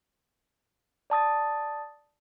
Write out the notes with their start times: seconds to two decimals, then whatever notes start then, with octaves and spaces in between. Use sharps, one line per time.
1.10 D5 A5 D#6 A6